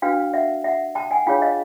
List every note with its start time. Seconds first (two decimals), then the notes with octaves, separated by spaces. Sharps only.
0.02 D4 F#4 B4 F5 G5
0.33 E5 F#5
0.64 E5 F#5
0.95 G5 A5
1.11 F#5 G#5
1.26 D4 F4 G#4 C#5 F5 G5
1.42 D#5 F5